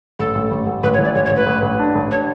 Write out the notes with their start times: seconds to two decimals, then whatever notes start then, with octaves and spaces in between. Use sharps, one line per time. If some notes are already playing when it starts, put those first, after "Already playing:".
0.19 A1 A4
0.35 A1
0.51 A1
0.67 A1
0.83 A1 B4
0.93 C#5
0.99 E3
1.05 D5
1.15 A1 C#5
1.26 C#5
1.31 A1
1.36 B4
1.47 A1
1.62 A1
1.79 D4
1.95 A1
2.11 D4 C#5